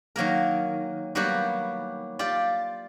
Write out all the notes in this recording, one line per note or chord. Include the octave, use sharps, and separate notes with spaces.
D#3 F#3 A#3 A#4
F#3 G3 A#3 B3 F#4 G4
F4 G4 D5